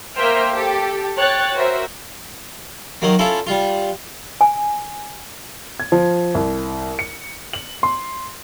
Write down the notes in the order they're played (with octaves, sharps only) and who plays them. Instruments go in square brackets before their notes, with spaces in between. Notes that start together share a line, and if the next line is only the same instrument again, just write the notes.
[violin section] A#3 A#4 C5 E5 G5 F6
G4 A4
C#5 G5 F#6 A6
F#4 A#4 C5 E5
[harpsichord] D#3 F#3 A#3
C#4 E4 F4 A4
G3 F4
[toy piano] G#5
[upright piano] G#6
F3
C2
C#7
F#7
C6